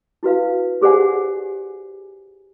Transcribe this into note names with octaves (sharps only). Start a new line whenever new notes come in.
E4 F#4 B4 F5
G4 G#4 C5 D5 F#5 G#5